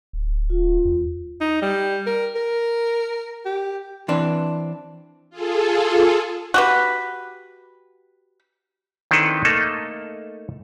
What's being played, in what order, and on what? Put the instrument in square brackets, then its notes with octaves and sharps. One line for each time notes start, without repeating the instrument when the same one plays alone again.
[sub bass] D1
[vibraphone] F4
[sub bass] E2
[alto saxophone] D#4
G3
A#4
A#4
G4
[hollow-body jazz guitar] E3 C4 D4 B4
[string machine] F4 G#4 A4
[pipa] F#4 G4 B4
[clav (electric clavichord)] D#3 C4 D4 E4 A4 B4
A3 A#3 D#4 A4